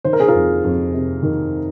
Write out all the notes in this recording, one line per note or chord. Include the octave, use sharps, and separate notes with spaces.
D#3 C5
A#4
G#4
F4 A#4
F2
F2
C3
D#3